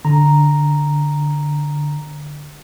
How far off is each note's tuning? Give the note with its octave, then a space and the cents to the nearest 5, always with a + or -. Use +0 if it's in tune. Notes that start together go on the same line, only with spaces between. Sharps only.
D3 +5 A#5 +0